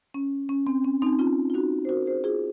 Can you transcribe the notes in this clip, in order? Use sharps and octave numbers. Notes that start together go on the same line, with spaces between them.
C#4
C#4
C4
C#4
C4 D#4
C#4 F4
F4
D#4 F#4
C5
F#4 A#4
G#4 C5
F4 G#4